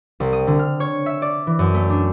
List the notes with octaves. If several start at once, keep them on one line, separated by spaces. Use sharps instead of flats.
C2
D#6
D3
F6
C#5
E5
D5
E3
F#2
A3
D4